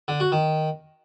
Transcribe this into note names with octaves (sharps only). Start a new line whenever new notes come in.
D3
F#4
D#3